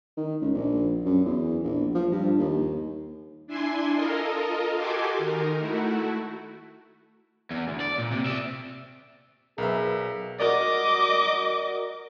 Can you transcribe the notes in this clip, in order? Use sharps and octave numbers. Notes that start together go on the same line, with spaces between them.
D#3
C#2
A#1
F#2
E2
A#1
F3
G2
D#2
D4 E4 G#5 C6
F4 A4 A#4 D#5
F#4 G4 A4 G#5 C6 D6
D#3 D#4 A#4
A3 E4 F#4
E2
D2
D5
A#2
C3
D5 E5
B1 G#4 A#4 B4 E5
F#4 A#4 D5 D#5 D6